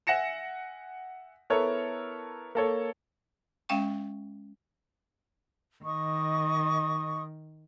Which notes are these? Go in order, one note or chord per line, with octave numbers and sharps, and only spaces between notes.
E5 F#5 G#5 A#6 C#7 E7
B3 E4 A4 A#4 C#5
A#3 A4 C#5
G#3 C#4 F5 G5 C#6
D#3 D#5 C#6 D#6